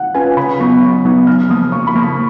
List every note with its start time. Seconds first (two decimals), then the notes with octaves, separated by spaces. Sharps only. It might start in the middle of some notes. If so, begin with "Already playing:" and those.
Already playing: F5 F#5
0.14 C#4 F4 B4 G#5
0.37 C#3 B5
0.60 F#3 B3 D#4 C#6
0.82 C#3
1.05 F#3 B3 D#4
1.27 C#3 F6
1.50 F3 A#3 D#6
1.72 C#3 C#6
1.87 B5
1.95 F3 A#3
2.03 C#6